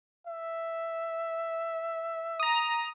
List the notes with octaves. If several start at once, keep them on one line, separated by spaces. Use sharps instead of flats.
E5
A#5 D#6